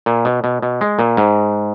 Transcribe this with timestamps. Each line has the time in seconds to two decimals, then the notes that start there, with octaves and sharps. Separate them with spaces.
0.06 A#2
0.25 B2
0.44 B2
0.62 B2
0.81 G#3
0.99 A#2
1.17 G#2